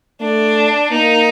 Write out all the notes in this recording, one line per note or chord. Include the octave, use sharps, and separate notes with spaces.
A3 D4
A#3 D#4